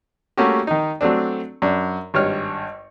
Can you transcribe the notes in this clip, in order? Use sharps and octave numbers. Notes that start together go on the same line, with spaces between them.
G3 A3 A#3 C#4 F#4 G4
D#3 D#4
F#3 A3 C4 D4
F#2 D4
G#1 G2 C#5 F6